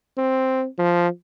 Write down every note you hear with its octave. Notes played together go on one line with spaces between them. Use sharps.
C4
F3